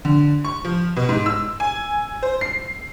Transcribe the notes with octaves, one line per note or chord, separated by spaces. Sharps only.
D3
C#6
F3
B2
G#2
E6
G#5
C5
C7